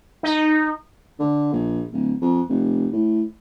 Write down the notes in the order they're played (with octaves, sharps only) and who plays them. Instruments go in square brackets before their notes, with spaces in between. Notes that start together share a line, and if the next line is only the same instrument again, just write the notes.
[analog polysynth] D#4
[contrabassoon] D3
A#1
D1
F2
F1
A2